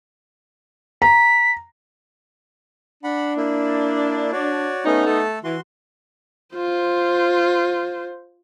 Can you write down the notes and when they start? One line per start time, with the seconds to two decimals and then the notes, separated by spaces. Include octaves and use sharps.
1.02 A#5 B6
3.04 D4 F#5 B5
3.37 A#3 E4
4.32 F#4 C#5 D5
4.85 A3 B3 C#4 D#4
5.06 A3 A4 A5
5.44 E3 F#4 C6
6.55 F4 C5